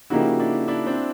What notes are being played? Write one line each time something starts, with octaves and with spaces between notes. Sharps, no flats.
C#3 F3 A#3 D#4 E4 F#4 G4
D4 E4
D4 E4
C4 D4